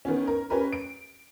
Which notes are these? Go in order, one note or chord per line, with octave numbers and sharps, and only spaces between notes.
D#3 B3 C#4
A#4
C#4 G4 A#4 B4
D7